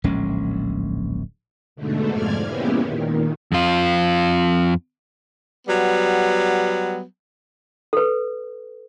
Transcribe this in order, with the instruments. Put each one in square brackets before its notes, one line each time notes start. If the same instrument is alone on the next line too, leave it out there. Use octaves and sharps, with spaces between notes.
[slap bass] D1 A#1 G#3 C#4
[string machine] G#2 B2 D3 A3
F2 G#2 F3 D5 F6 G#6
G#3 A#3 B3 C#4 E4 G4
A#2 D#3
[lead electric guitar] F2 F4
[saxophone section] F#3 G3 B3
[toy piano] A4 B4